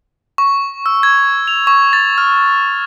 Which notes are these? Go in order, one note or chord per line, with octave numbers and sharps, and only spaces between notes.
C#6
E6
G#6
F7
C#6
A6
F6